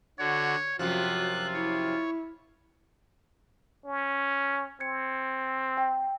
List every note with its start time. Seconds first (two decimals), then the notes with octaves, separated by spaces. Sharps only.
0.19 D3 F#4 C#5
0.79 F#2 C3 F3 F4 F#4 F#6
1.53 E4 C#5
3.86 C#4
4.80 C4 G#6 C#7
5.77 G5